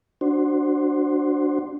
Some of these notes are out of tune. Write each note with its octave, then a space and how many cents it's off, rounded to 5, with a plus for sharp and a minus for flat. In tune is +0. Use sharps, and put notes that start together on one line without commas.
D4 +0 F#4 +0 C5 +5